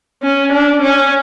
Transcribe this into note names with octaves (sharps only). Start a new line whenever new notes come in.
C#4
D4
C#4